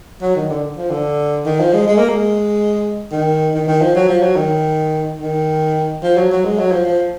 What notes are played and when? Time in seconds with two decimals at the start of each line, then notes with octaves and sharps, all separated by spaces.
0.22 F#3
0.36 D#3
0.50 D3
0.77 F3
0.90 D3
1.46 D#3
1.60 F3
1.74 G#3
1.88 G#3
1.99 A#3
2.09 G#3
3.12 D#3
3.54 D#3
3.68 D#3
3.82 F3
3.95 F#3
4.09 F3
4.23 F#3
4.36 D#3
5.20 D#3
6.03 F3
6.17 F#3
6.31 F#3
6.45 G#3
6.59 F#3
6.72 F3
6.86 F3